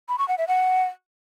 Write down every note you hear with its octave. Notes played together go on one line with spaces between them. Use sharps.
B5
C#6
F#5
E5
F#5